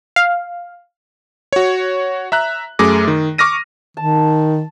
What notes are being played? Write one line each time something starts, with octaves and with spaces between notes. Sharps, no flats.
F5
F#4 C#5
E5 A#5 F#6
F#2 A3 G#4 D6 A#6
D#3
C#6 D6 F6 A#6 D#7
D#3 A5